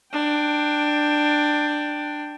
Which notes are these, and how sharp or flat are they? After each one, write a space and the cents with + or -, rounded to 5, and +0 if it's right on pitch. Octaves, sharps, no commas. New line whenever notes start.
D4 +15 G5 +0